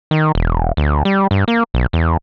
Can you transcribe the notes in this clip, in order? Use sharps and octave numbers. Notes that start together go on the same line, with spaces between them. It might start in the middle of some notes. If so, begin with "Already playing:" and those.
D#3
E1
D2
G3
G2
A#3
B1
E2